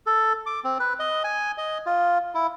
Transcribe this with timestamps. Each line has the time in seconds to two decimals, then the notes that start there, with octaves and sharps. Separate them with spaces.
0.06 A4
0.46 D6
0.64 C4
0.80 B4
1.00 D#5
1.24 G#5
1.58 D#5
1.86 F4
2.35 E4